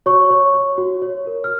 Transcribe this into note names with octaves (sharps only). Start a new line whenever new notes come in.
F#4 C#5 C#6
C#5
C#5
F#4
C#5
A#4
F6